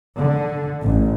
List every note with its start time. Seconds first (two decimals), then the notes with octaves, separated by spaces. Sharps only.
0.17 D3
0.83 A1